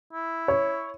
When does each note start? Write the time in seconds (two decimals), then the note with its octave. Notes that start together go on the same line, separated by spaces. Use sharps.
0.13 E4
0.48 C#5